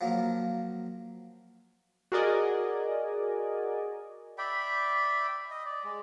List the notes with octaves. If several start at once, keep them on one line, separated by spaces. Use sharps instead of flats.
F3 F#3 A#3
F#4 G#4 A#4 D5 D#5 G#5
D5 E5 G5 B5
D#5
D5
G#3